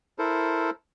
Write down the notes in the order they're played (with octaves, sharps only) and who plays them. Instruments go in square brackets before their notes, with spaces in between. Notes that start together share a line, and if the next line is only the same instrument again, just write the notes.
[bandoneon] E4 A4 A#4 C5